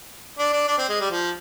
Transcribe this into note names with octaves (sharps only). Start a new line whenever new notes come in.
D4
D4
D4
C4
G#3
G3
F3